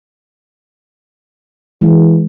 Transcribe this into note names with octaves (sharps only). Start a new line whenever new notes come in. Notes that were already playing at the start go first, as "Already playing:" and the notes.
E3 G#3